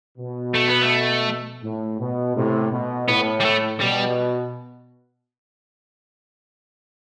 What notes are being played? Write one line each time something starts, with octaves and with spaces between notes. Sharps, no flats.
B2
A3
B3
A3
A2
B2
A2 C3
B2
A2 B3
G3
A3
B2 G3